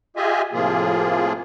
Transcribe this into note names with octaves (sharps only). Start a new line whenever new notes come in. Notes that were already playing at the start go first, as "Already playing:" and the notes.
F4 G4 G#4 D#5 E5 G#5
A2 C3 F3 A#3 F4 G#4